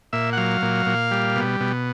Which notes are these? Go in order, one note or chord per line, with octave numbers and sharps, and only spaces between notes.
A#2 E5
F#5
F#3 F5
A#2
A#2
G3
B2
B2